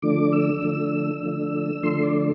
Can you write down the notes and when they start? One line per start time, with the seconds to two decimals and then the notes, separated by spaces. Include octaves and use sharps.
0.02 D3 F3 A3 D4 D6
0.32 E6
0.62 D3 F3 A3 D4
1.23 D3 F3 A3 D4
1.83 D3 F3 A3 D4 C6
2.03 D5